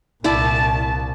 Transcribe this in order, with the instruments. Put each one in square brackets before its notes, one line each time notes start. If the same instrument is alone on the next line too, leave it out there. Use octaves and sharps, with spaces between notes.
[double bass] C2 A#2 [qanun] E4 D5 [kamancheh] A5